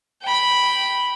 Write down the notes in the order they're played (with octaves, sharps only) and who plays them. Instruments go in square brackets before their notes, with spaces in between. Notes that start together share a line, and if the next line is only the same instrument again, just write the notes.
[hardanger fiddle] G5 B5